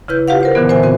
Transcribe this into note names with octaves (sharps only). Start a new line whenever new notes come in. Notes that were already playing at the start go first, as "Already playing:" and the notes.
C#3 E4 B4 G6
F4 G4 B4 F5 F#5
A#4 C5 F#5
A#2 D3 E3 B3
C5 E5 G#5
C4 F#4